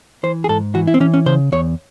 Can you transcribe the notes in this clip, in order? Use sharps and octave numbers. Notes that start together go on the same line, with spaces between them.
E3 C5
G#4
G#2 A4
E3 F#4
E4
C4
E3 C#4
C#4
C#3 C5
E2 C#5